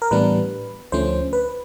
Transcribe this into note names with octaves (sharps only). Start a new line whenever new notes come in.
A#4
A2 E3 G3 B3 D4 B4
D2 D3 F3 A3 C#4 C5
B4